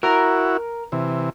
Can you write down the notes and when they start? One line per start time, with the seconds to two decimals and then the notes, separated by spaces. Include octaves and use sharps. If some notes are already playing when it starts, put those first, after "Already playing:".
0.03 E4 F#4 A#4 A#5
0.92 C3 E3